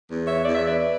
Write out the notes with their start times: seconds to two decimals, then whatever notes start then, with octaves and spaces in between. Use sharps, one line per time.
0.10 E2
0.27 C#5 E5
0.44 E2 D5
0.55 E5
0.65 B4 D5